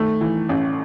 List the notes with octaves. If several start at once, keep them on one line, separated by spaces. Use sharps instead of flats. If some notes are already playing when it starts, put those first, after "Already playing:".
Already playing: D#3 A3
E3
A1